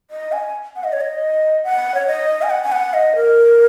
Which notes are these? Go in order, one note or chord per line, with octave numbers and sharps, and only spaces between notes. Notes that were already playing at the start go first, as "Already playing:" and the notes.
D#5
G#5
F#5
D#5
C#5
D#5
F#5
C#5
D#5
G#5
F#5
G#5
F#5
D#5
A#4